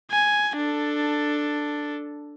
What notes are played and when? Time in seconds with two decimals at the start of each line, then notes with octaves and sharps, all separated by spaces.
0.11 G#5
0.57 D4 A4